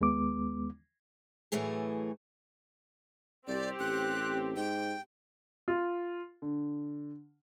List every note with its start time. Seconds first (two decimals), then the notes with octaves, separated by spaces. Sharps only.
0.01 D#2 G#3 B3 D6
1.52 A2 E3 F#3 A3 G#4
3.47 C2 C4 G4 D5
3.80 A1 F#6
4.56 G#2 G5
5.68 F4
6.42 D3